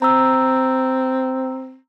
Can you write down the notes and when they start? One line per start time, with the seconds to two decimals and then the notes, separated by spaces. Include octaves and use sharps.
0.02 C4 A#5 E6